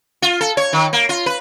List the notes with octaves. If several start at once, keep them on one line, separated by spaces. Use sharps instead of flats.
F4
A4
C#5
D#3
A#3
F4
B4